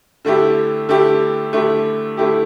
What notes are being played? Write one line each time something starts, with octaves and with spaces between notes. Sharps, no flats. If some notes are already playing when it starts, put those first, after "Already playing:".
D3 A3 E4 G4
D3 A3 E4 G4
D3 A3 E4 G4
D3 A3 E4 G4